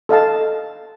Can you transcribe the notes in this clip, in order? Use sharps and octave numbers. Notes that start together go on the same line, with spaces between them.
A4 D#5 F5 A5